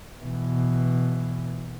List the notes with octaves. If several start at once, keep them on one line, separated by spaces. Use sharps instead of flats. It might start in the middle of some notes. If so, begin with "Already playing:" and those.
B2 E3